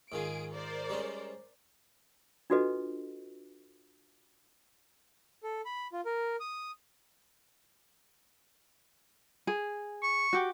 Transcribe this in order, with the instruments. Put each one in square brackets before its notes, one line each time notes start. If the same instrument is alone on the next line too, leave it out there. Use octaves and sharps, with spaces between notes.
[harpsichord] G#2 D#3 F4 [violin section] G#4 D7
[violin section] A#4 C5 D5
[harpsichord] G3 G#3 C#4
[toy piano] D4 F4 F#4 A4 B4 D#5
[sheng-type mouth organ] A4
B5
F4
A#4
D#6
[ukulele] G#4
[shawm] C#6
[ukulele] F#4 G4